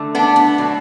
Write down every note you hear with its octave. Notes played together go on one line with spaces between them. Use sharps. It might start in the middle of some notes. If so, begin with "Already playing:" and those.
Already playing: D3 A3
B3 D4
B3
B2 F#3 A3